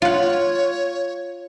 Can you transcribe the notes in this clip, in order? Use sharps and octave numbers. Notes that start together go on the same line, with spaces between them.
F4 C#5 F#5